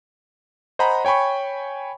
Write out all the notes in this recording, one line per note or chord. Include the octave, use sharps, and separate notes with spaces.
C5 D#5 F#5 G#5 A#5 B5
C#5 G5 G#5 B5 C#6